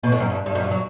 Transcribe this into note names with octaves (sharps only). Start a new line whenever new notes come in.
B2
A2
F#2
G2
G2
F#2
G2
F#3